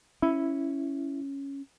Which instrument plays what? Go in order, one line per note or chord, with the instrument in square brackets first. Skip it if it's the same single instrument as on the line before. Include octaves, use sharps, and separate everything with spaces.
[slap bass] C#4 [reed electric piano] E4